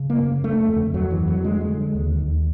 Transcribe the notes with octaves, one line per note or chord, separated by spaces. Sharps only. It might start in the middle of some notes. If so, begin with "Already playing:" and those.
Already playing: C#3
A#3
F#2
D3 A3
F2
F2 F#3
E3
F2
F#3
D3 G#3
G#3
D3
D#2
D#2